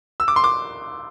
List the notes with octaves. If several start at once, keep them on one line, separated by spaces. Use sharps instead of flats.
E6
D6
C6
D6